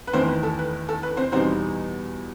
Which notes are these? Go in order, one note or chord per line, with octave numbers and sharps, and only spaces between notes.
B4
E2 D#3 A3 C4 E4 C5
B4
A4
B4
A4
B4
C4 C5
E2 B2 G3 B3 C4 D#4 C5